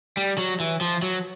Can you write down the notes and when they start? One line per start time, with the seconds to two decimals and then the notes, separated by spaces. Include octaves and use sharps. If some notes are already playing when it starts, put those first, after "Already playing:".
0.17 G3
0.38 F#3
0.60 E3
0.81 F3
1.02 F#3